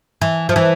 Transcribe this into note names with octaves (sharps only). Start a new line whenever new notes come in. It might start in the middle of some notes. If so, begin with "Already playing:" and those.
E3
F3
E3